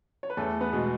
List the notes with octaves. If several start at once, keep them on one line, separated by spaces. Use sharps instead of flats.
C#5
B4
E2 A3 A4
B3 B4
B2 G#3